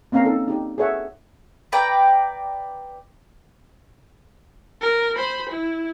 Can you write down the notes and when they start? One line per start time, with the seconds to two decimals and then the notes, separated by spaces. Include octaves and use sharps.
0.12 A#3 C4 C#4 F5 A#5
0.25 D#4 A4
0.48 D#4 G4
0.78 G#4 A4 C#5 E5 F#5
1.72 B4 D5 G5 A#5
4.81 A#4
5.16 C5 B5
5.49 E4